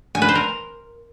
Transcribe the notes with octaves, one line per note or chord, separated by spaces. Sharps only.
G#5
B4
C5
A#4